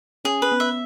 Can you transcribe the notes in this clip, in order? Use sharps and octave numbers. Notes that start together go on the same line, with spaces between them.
C#4 G#4
B4
B3
E5